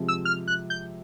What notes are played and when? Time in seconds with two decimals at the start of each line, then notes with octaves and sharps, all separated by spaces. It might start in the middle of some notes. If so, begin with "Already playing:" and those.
Already playing: C3 F3 G#3
0.08 E6
0.25 F6
0.48 F#6
0.70 G6